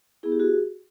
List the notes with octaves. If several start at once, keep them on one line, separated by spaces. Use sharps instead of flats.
B3 E4 G#4
G4
F#4 G#4